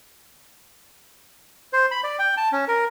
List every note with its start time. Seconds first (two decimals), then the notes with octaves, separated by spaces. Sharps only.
1.73 C5
1.91 B5
2.04 D5
2.19 G5
2.37 A5
2.52 C#4
2.68 A#4